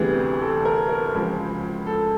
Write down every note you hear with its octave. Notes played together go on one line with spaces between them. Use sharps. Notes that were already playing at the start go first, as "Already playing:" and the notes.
Already playing: D2 C3 E3 G3 B3 G#4
A4
A#4
A#4
C#2 C#3 F3 G#3
A4